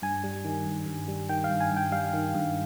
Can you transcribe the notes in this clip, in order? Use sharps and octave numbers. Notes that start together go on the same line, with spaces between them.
G2 G#5
G3
D#3
G2
G2
G3
D#3 G5
F5
G2
G#5
G2
G5
G3 F5
D#3
G2